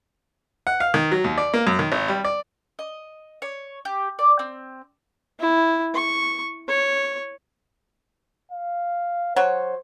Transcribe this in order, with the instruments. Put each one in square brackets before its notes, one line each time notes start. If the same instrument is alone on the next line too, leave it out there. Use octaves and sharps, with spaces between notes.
[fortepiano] F#5
F5
D#3
F#3
D#2
D5
A#3
F#2
D#3
G#1
G3
D5
[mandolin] D#5
C#5
G4
D5
C4
[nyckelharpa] E4
C#6
C#5
[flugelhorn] F5
[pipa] F#3 C#5 [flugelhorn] C5